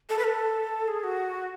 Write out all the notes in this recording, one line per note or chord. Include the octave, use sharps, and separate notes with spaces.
A4
B4
A4
G#4
F#4